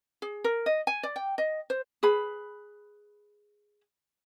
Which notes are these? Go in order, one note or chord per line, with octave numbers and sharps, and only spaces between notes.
G#4
A#4
D#5
G#5
D5
G5
D#5
C5
G#4 B4 B5